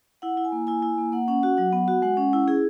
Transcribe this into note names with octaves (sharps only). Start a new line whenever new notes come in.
E4 F#5
E4
G#5
A#3
E4 G#5
E4
A#3
A#3 F#5
C#4 F#5
F#4 F#5
F#3 F#5
B3
F#4
G#3 F#5
C#4
E4
E4 G#4